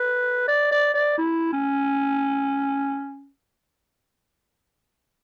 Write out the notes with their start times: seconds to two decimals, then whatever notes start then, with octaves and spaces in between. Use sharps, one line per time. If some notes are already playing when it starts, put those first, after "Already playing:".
Already playing: B4
0.48 D5
0.71 D5
0.94 D5
1.18 E4
1.53 C#4